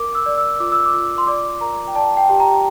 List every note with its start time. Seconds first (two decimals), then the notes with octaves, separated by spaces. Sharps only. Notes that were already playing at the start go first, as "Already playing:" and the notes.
Already playing: A#4 D6
0.15 E6
0.26 D5
0.38 E6
0.60 F4 D6
0.72 E6
0.86 D6
0.94 F4
1.18 C6
1.27 D5 D6
1.61 A#4 A#5
1.87 G5
1.95 D5 A5
2.17 G5
2.29 G4
2.40 A#5